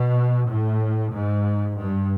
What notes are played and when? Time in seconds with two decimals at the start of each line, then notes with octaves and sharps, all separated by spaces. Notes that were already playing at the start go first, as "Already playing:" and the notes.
Already playing: B2
0.48 A2
1.13 G#2
1.79 G2